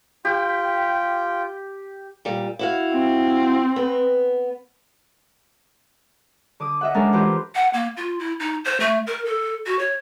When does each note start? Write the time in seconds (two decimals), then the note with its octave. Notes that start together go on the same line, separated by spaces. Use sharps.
0.25 F4 G4 G5
2.25 A#2 G3
2.59 E4 F#4 F5
2.92 C4
3.76 B3
6.60 D3 D6 D#6
6.81 D#5 E5 F#5
6.94 G#3 C#4 D4 A4 A#4
7.12 E3 E4 F4 G4 C5
7.55 F#5
7.73 A#3
7.97 F4
8.19 E4
8.40 D#4
8.65 C5
8.80 A3
9.07 A#4
9.25 A4
9.66 F#4
9.79 C#5